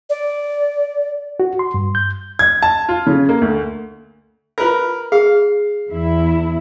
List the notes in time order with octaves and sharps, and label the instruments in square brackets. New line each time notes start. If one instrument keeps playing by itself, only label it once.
[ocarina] D5
[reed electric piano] F#4
C6
G2
G6
[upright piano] G#6
A5
F4
C#3
A#3
D2
[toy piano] F4 B5 [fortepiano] A#4 B4
[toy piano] G#4 [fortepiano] F5
[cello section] E2 E4